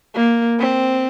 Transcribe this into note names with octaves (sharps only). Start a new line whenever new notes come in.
A#3
C4